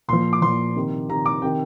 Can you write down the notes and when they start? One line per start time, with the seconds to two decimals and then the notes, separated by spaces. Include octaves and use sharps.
0.08 A#2 F3 C6
0.33 D6
0.42 A#2 F3 C6
0.76 C3 D#3
1.09 C3 D#3 A#5
1.26 D6
1.42 C3 D#3 G5